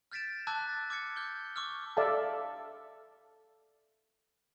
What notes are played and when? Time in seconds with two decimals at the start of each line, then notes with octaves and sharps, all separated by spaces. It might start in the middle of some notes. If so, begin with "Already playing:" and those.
0.12 F6 G6 A6 B6 D7 E7
0.47 A5 D6 E6 F#6 G#6 B6
0.69 A6
0.90 D6 F6 G#6 C#7
1.16 F6 G6 G#6 G7
1.56 C#6 D6 E6 F6
1.97 A4 D5 E5 F5 A5